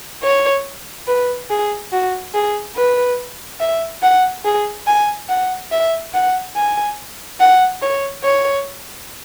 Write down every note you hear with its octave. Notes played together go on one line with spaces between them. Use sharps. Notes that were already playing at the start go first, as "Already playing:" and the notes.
C#5
B4
G#4
F#4
G#4
B4
E5
F#5
G#4
G#5
F#5
E5
F#5
G#5
F#5
C#5
C#5